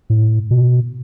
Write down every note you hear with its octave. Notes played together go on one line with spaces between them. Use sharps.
A2
B2